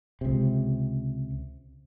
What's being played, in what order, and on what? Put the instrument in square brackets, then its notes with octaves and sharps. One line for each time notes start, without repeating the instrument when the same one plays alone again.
[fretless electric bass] C#2 C3